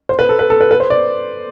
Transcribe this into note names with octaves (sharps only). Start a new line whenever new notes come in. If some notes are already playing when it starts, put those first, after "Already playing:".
C5
B4
A4
B4
A4
B4
B4
C5
D5